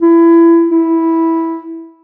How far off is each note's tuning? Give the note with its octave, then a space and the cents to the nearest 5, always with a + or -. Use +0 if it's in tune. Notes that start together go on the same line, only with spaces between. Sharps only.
E4 +25
E4 -10